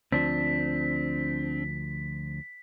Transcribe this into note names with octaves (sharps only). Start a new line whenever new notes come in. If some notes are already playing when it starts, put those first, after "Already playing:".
D2 F3 C4 D4 B6